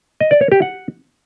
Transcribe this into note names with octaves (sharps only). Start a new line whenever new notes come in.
D#5
D5
C#5
G4
F#5